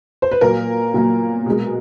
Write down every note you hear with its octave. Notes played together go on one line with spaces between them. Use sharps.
C5
B4
A#2 F#3 A#3 A#4
A#2 F#3 A#3
B2 G#3